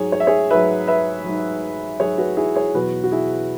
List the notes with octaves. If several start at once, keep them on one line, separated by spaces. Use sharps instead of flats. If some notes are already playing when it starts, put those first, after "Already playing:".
Already playing: G#2 F#3 G#4 C#5
C#5
E5
G#4 C#5
G#2 F#3 B4 E5
B4 E5
G#2 F#3
G#2 F#3 G#4 C#5
F#4 B4
E4 G#4
G#4 C#5
E2 B2 F#3 F#4 B4
F#4
E4 G#4